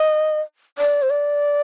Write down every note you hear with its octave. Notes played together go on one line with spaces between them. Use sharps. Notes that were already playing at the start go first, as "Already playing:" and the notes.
Already playing: D#5
D5
C5
D5